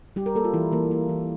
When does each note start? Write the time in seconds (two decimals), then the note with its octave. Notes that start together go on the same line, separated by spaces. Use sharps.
0.16 G3 G4
0.26 A#4
0.35 A#3 A4
0.45 F4
0.53 E3 E4
0.72 E3 A#3
0.91 A#3
1.09 E3